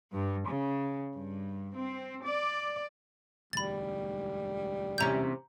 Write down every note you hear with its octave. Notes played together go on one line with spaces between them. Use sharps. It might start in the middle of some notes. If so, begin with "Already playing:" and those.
G2
C#3
G2
C4
D5
E1 D2 G#2 G3 B5 A6
E2 C3 C#4 A#5 G6